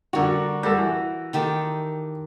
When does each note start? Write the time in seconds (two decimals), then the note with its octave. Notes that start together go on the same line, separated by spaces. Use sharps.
0.13 D3 G3 F#4 A#4
0.63 G3 F#4 A4
0.78 E3
1.33 D#3 G4 A4